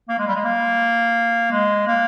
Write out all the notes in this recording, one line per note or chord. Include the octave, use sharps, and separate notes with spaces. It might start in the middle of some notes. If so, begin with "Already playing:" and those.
A#3
G#3
G3
G#3
A#3
G#3
A#3